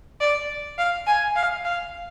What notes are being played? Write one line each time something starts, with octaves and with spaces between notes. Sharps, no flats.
D5
F5
G#5
F5
F5